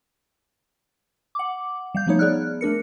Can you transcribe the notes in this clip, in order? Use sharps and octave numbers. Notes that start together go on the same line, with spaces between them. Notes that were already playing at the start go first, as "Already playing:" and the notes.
F#5 D6
G3 F5 G6
F3 A3 B3 D#4 C#5
B3 G#4 D5 F6 F#6
A3 D4 A#4 C#7